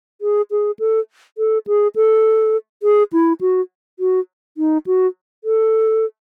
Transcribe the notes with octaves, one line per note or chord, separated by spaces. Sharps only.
G#4
G#4
A4
A4
G#4
A4
G#4
E4
F#4
F#4
D#4
F#4
A4